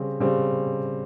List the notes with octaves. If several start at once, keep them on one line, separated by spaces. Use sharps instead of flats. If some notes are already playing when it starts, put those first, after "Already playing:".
Already playing: C#3 G3 C4
C#3 G3 C4